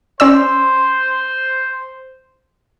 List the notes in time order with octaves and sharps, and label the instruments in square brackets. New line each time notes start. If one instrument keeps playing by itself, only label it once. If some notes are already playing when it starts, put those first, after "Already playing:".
[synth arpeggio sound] C#4 D5 E6 [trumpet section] C5